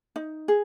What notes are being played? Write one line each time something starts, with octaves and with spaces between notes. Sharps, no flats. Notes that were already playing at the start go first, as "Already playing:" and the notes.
D#4
G#4